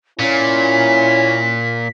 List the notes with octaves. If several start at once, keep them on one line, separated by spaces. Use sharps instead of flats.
A#2 C#4 E4 B6